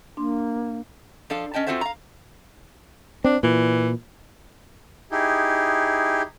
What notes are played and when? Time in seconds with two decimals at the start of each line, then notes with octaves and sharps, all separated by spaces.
0.17 A#3 D4 C6
1.30 F3 D4 A4 F5
1.54 C#4 D#5 G5 A5
1.67 C4 F4 F#4 A4 C5 E5
1.81 F5 A#5
3.24 C4 D4
3.43 A#2 E3
5.11 D#4 E4 G4 G#4